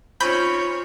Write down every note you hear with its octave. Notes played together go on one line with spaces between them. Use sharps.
C4 C#4 D#4 F4 C#5 B5 G6